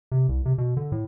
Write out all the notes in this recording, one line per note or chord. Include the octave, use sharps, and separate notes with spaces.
C3
C2
C3
B2
D3
A2